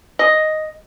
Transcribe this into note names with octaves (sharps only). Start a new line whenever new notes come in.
D#5